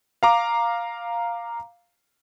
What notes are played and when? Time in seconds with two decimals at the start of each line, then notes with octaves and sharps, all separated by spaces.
0.23 F5 A#5 D6